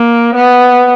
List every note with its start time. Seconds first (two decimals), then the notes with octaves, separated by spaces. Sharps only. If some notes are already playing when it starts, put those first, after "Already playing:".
Already playing: A#3
0.35 B3